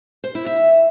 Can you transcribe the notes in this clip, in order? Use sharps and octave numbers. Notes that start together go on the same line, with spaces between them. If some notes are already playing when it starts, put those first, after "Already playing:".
C5
E4
E5